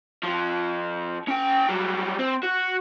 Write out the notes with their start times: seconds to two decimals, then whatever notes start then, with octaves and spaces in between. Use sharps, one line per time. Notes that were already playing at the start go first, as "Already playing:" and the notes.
0.23 F2 F3
1.28 C#4 G5
1.69 F#3 G3
2.19 C4
2.43 F#4